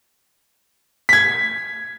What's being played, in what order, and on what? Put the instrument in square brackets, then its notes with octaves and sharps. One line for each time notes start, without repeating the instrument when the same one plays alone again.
[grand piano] G#6 B6